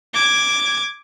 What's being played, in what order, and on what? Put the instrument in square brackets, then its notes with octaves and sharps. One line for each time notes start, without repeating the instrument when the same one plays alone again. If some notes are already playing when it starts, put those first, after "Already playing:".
[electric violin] D6 G#6